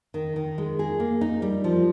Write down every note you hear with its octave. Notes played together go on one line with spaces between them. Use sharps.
D#3
D#3
G#3
G#4
A#3
D#4
G3
F3